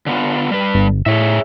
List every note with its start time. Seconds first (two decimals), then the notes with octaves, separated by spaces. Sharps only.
0.06 D3 B3 F4
0.51 G3 B4
0.74 G1
1.06 A2 G#4 C#5 E5